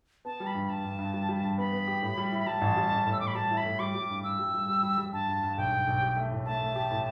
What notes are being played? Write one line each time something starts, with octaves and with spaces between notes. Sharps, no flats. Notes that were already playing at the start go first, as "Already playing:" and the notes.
B3 A5
G3
B5
G2
G2 A5
G2
G2
G3
G3
G2
B3 B5
B3
G4
A2
G3
E4
B5
G3 A5
A1
G3
A1
A2
E6
A2 D6
B5
G3 A5
E4
B5
A2
G3 D6
G3
G2
G2 E6
G3
G3
G3
G3
G3
G2 A5
G2
G2
B1 G5
B1
B1
G4
A3
A2
A3 A5
A3
G4
A2